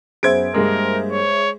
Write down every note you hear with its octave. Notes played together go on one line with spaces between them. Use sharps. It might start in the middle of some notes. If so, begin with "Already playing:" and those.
F#2 B3 G#4 C5 E5 G#6 D7
G2 G#3 A#3 G4 A#4
C#5